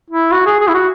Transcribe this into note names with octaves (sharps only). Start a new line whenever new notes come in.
E4
F#4
G#4
G#4
E4
F#4